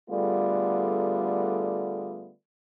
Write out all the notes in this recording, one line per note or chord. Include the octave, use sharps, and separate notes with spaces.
D3 G3 A3 B3 F4 G#4